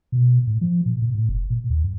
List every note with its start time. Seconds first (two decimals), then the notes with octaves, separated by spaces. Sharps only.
0.12 B2
0.47 A2
0.61 F3
0.86 A#2
1.02 A#2
1.14 A2
1.29 F1
1.50 A#2
1.70 D#2
1.84 F#2